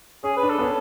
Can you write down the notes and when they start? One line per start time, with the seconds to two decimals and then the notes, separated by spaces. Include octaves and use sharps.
0.24 C#4 G#4
0.37 B4
0.43 D4
0.50 A4
0.58 B3
0.62 C#4